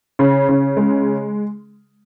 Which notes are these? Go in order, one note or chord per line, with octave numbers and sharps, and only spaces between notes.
C#3
C#3
G#3